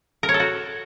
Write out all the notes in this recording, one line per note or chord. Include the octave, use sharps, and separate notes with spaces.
A#4
C#5
A4
F#4